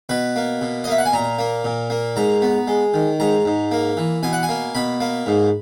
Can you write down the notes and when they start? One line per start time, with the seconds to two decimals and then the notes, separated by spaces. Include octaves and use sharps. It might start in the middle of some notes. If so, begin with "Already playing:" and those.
0.09 B2 B4
0.36 A#3
0.61 B2
0.84 D#5
0.87 A#3 E5
0.98 F#5
1.06 G#5
1.13 A#2 A#5
1.39 A#3
1.65 A#2
1.90 A#3
2.16 G#2 A#5
2.42 B3
2.68 G#3
2.94 D#3
3.20 G#2 A#5
3.45 G#2
3.71 A#3
3.97 E3
4.23 B2 G#5
4.33 F#5
4.43 G#5
4.49 A#3
4.75 B2 B5
5.00 A#3
5.26 G#2